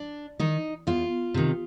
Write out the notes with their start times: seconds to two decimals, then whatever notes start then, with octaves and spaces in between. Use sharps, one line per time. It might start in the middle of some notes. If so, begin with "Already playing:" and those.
Already playing: D4
0.39 D#3 D#4
0.87 E2 F4
1.34 C3 D#3